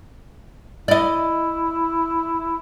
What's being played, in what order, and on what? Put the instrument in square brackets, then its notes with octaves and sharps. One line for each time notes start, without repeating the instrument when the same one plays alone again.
[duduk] E4 [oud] D5 D#5